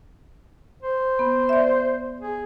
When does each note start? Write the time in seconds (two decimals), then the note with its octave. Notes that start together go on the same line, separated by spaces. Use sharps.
0.82 C5
1.19 B3
1.49 D5 E5
2.20 G#4